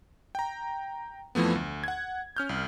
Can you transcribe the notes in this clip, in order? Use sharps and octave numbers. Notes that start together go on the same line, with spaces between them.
G5 A#5
F2 E3 F3 A3 B3
D2
F#5 G#6
C#4 F6 G6
C2